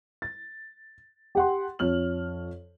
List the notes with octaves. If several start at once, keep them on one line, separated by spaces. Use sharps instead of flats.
A6
G4 F#5 C6
F2 C#5 F6 F#7